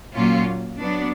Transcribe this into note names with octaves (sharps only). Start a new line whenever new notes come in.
A#2 F#3 A#3 C#4 F4
F#3 B3 D4